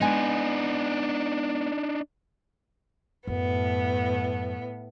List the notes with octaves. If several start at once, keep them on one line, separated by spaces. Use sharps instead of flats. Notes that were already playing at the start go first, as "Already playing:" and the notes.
G#3 B3 D4 D#4 G#5
F#2 A2 B3